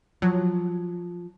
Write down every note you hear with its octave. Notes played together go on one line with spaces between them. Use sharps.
F3 F#3